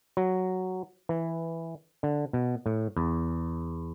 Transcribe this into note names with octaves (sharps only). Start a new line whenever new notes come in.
F#3
E3
D3
B2
A2
E2